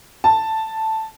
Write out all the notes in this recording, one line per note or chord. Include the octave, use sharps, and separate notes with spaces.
A5